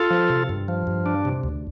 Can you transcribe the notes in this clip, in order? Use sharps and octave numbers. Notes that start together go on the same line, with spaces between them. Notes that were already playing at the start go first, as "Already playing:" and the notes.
Already playing: F4 A4
F3
C3
G2
F3
G2
D4
C3
D2